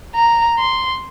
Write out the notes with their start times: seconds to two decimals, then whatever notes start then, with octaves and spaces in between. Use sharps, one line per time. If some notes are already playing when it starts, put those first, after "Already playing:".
0.15 A#5
0.59 C6